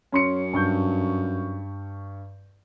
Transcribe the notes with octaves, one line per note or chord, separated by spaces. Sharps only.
F#2 C#4 C6 C#7
G2 C#6 G6